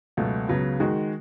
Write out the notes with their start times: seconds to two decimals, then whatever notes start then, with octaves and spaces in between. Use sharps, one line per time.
0.17 C#2 B2 F#3 A3
0.48 C#2 C#3 F#3 B3
0.80 D#3 G#3 D#4 F#4